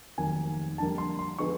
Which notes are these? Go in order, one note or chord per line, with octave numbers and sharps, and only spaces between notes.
F1 D#2 D#3 F#3 A#3 G#5
F2 D3 G3 A#3 A5
C6
C6
D3 F3 G#3 B3 C#6